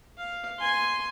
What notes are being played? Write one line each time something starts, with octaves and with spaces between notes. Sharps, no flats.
F5
G#5 C6